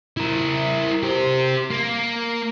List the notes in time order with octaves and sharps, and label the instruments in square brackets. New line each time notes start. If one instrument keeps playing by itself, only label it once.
[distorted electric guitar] E4 A#4
G4 C5
A#3